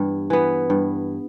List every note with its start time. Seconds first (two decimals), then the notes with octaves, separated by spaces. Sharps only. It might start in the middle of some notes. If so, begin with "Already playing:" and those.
Already playing: G2 E3 B3
0.30 E3 B3
0.70 G2